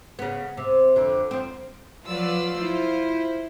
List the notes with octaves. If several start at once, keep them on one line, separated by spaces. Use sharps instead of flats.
C#3 B3
C3
F2 D3
F3 C4
F3 F#3 F4 B4 D5 E6
E4 C5